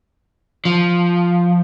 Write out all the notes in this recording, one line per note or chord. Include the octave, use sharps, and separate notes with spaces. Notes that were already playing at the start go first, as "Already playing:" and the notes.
F3